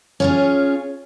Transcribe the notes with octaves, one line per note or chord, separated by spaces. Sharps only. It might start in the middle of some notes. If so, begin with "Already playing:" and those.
C#4 F4 G#4